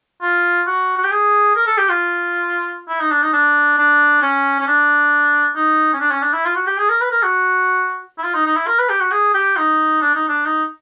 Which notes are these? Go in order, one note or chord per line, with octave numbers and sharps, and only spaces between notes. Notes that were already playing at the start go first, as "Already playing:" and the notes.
F4
F#4
F#4
G4
G#4
A#4
A4
G4
F4
E4
D#4
D4
D#4
D4
D4
C#4
C#4
D4
D#4
C#4
D4
C#4
D4
E4
F4
F#4
G4
G#4
A#4
B4
A#4
F#4
E4
F4
D#4
D#4
E4
A#4
B4
G4
F#4
G#4
G4
D#4
D4
D#4
D4
D#4